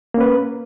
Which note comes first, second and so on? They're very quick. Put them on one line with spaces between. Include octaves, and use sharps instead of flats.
A#3 C#4 B4